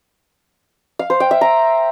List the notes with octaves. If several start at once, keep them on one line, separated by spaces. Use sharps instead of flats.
F5
C5
G5
E5
A#5